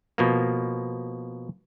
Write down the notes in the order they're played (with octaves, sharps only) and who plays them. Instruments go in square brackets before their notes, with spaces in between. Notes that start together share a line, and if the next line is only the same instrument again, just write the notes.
[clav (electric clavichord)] B2 F3 A#3